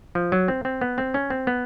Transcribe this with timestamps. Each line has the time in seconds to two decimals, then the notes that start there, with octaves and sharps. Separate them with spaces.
0.15 F3
0.32 F#3
0.48 C4
0.65 C4
0.81 B3
0.98 C4
1.14 C#4
1.30 C4
1.47 B3